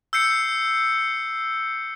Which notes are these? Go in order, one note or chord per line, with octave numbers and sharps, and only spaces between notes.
E6 G6 C7 C#7